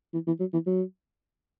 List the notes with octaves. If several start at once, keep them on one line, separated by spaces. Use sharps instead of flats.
E3
E3
F#3
E3
F#3